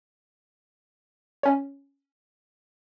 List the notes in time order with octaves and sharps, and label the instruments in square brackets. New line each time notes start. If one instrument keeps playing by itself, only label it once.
[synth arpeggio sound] C#4 C#5